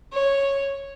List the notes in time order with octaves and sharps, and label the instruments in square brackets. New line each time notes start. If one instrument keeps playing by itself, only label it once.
[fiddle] C#5